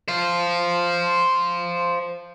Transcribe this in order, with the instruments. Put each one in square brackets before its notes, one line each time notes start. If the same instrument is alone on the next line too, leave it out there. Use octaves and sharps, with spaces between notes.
[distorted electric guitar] C5 F5